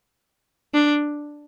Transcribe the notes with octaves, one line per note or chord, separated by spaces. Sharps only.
D4